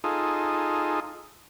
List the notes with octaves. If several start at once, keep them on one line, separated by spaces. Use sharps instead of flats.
D#4 F4 G#4 A4